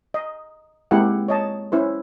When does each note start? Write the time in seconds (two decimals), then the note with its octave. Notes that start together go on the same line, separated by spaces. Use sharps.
0.14 D#5
0.91 G#3 A#3 C4 E4 G4 F#5
1.28 C#5 D#5 A5
1.72 C#4 E4 B4 C5